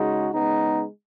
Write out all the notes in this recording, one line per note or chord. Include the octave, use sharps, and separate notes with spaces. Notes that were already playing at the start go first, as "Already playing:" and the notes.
Already playing: C#3 G#3 D#4 F#4
C#3 G#3 B3 D#4